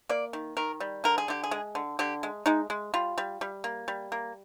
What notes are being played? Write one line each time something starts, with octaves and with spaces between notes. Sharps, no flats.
A#3 D5
D#3
D#3 A#4
G3
D3 A#4
G#4
D3 G4
G#4
G#3
D3
D3 G4
G#3
G#3 D#4
G#3
G3 F4
G3
G3
A#3
G3
A#3